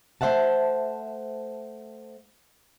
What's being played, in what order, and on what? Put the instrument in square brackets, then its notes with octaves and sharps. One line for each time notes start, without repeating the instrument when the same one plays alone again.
[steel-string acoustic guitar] A3 C5 C#5 E5 F#5 A5